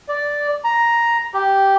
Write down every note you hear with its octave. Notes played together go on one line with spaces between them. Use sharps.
D5
A#5
G4